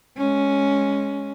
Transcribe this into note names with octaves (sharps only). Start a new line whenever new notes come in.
G#3 C#4